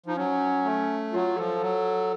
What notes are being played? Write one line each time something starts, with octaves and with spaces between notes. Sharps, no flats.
F3 D#4
F#3 C#4
A3
F#3 F4
F3 A4
F#3